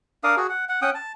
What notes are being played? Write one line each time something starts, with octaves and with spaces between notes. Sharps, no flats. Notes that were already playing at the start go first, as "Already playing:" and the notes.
D4 A#4 F5 D#6
F#4 G#4
F#5
F#5
C#4 F#5 G5 D#6
A5